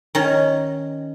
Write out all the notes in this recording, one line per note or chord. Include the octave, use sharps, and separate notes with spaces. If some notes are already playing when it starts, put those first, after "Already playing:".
D#3 C#4